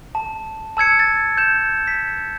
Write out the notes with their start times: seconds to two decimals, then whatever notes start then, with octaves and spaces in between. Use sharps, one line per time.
0.15 A5
0.77 A5 E6 G#6 C#7
0.99 A6
1.37 G6 E7
1.87 B6